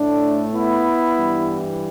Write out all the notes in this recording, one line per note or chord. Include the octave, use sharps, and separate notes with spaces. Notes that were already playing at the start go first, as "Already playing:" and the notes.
Already playing: A2 A3 D4
B3 E4
G2 E3 G3